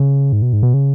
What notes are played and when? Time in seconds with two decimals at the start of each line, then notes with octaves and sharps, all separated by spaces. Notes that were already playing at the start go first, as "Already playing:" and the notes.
Already playing: C#3
0.33 G#2
0.42 B2
0.53 G#2
0.63 B2
0.74 C#3